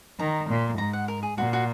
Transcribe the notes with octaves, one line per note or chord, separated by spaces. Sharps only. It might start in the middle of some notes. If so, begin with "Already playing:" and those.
D#3 A#5
A#2
G#2 A#5
F#5
A#4
G#4
A#2 F#4
F#4